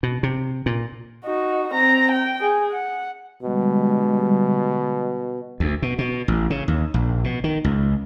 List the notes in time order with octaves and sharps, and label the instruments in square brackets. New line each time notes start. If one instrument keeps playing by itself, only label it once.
[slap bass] B2
C3
A#2
[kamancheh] D#4 F#4
C4 A#5
G5
G#4
F#5
[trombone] B2 [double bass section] D3 G3 G#3
[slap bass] D2
B2
B2
A1
C#3
D#2
A#1
B2
D#3
C#2